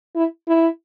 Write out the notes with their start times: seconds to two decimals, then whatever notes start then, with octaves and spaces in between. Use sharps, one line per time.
0.16 E4
0.48 E4